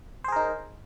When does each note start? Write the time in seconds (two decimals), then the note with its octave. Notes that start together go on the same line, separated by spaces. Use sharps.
0.24 C5
0.28 G#4
0.32 A#4
0.36 D#4